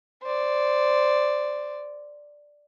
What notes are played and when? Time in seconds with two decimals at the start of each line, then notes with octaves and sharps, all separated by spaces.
0.23 C5 D5